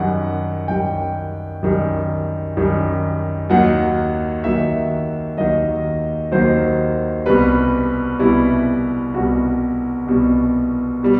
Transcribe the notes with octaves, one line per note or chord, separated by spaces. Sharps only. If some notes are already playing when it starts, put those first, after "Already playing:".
Already playing: F#2 D#3 G3 F#5
F#2 D#3 G3 G5
F#2 D#3 G3
F#2 D#3 G3
D#2 D#3 F#3 F#5
D#2 D#3 F#3 E5
D#2 D#3 F#3 D#5
D#2 D#3 F#3 C5
C2 B2 G3 B4
C2 B2 G3 E4
C2 B2 G3 F#4
C2 B2 G3
B2 G3